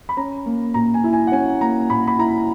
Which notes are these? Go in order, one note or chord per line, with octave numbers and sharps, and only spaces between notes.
B5
C#4 A#5
A#3
A#2 A#5
G#5
E4
G#5
F#5
C#4 G#5
A#3 A#5
A#2 B5
B5
E4 A#5